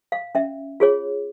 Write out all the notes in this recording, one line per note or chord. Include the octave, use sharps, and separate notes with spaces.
F5
C#4 E5
F4 G#4 C#5